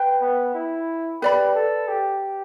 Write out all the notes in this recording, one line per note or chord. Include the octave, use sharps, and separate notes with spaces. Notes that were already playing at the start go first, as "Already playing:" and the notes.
Already playing: B4 G5
B3
E4
G4 B4 D5 B5
A4
G4